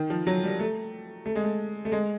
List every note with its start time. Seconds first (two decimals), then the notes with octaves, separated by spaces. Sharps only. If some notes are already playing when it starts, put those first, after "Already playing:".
Already playing: D#3
0.10 F3
0.27 F#3
0.43 G3
0.59 A3
1.26 A3
1.35 G#3
1.44 A3
1.85 A3
1.92 G#3